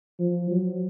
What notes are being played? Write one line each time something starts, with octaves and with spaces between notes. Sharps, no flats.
F3
F#3